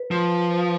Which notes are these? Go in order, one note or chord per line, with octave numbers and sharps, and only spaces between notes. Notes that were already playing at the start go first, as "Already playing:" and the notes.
Already playing: B4
F3